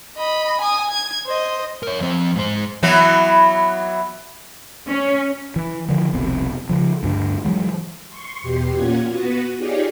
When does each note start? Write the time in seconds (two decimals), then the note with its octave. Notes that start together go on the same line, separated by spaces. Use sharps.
0.17 D#5 B5
0.61 G#5 D#6
0.91 G#6
1.26 C5 D#5
1.83 A#4 C#5
2.00 F2 C4
2.36 G#2 C5
2.83 E3 F#3 B3
4.88 C#4
5.56 E3
5.89 D3 E3 F3
6.13 F1 C2 B2 C4
6.69 C#3 F3
7.03 D2 G2 D4
7.45 E3 F#3 G#3
8.08 C6 C#6
8.41 E2 B2 G4 C6
8.75 A#2 A#3 C#4 F4 F#5 G#6
9.07 B3 F#4 B4
9.57 D#4 F4 G4 G#4 C#5 D5